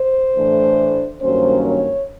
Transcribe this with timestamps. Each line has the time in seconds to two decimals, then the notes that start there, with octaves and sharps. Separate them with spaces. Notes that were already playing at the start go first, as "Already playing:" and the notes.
Already playing: C5
0.36 A2 E3 A3 D4
1.21 G2 D#3 F#3 A#3 C#4 C5
1.65 C#5